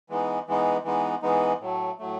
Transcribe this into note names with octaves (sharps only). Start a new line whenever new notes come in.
E3 G#3 B3 D#4
E3 G#3 B3 D#4
E3 G#3 B3 D#4
E3 G#3 B3 D#4
A2 F#3 A3
A2 F#3 A3